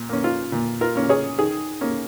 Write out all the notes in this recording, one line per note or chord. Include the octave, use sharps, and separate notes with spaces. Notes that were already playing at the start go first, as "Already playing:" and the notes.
Already playing: A#2
A#3 C#4
F4
A#2
F4 A#4
A#3 C#4
G#4 C#5
D#3 G#4
A#3 C#4